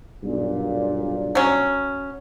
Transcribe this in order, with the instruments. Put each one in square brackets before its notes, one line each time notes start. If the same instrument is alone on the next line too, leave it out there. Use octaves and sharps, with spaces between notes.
[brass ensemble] B1 G2 A#2
[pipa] F#3 C#4